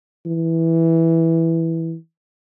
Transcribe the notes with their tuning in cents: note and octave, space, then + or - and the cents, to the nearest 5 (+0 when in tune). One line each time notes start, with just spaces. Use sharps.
E3 -5